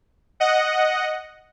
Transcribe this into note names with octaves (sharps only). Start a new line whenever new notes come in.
D#5 F#5